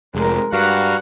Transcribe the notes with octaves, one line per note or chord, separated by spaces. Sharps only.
F1 G#3 A#4
G2 F#4 F5 F#5 A#5